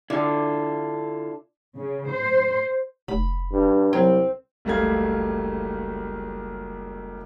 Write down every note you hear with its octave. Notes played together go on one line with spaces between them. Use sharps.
D3 E4 F4 A4
C#3
C5
F1 B5
G2
C2 F#3 C4
F#1 C#2 G3 A3 F5 G#6